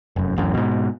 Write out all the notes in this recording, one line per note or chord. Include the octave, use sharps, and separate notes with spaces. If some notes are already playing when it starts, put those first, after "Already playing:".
F1 F#2
D1 A1 F#2
G#2 B2